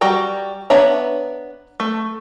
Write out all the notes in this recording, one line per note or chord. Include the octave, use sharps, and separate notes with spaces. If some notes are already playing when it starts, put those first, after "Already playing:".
G3 F#4 G5 A#5
B3 D4 C#5 E5 A#5
A3